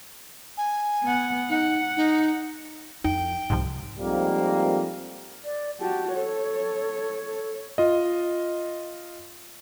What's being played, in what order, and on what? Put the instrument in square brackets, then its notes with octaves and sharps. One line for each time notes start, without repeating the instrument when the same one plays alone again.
[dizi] G#5
[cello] B3 F#5
[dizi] D#4 [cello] F#5
[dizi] D#4
[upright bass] F2 [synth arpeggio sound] D#4 [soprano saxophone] G5
[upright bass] C2 [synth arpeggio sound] G#2 C3 F3
[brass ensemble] F2 G#2 G3 A#3
[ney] D5
[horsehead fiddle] F#4 G4 [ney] A5
[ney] A4 [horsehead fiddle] C#5
[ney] A4
[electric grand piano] F4 D#5